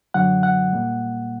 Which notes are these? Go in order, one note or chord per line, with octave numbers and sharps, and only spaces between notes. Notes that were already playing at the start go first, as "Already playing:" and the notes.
F#2 D3 F#3 F#5
F#5
A#2 G3 A#3